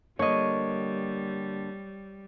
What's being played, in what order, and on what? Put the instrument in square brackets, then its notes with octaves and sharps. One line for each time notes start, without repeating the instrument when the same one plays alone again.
[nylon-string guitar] D3 A#3 [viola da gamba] G3 [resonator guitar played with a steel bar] C#5 D#5